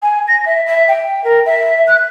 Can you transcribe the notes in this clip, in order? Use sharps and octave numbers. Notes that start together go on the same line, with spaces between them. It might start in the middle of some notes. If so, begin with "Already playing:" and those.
G#5
A#6
E5
E5
G5
A#4
E5
F#6